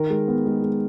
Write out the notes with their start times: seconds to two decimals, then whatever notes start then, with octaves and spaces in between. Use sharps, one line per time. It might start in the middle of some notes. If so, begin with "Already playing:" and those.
Already playing: D#3 A#4
0.10 G#3
0.28 B3
0.45 G#3
0.62 G#3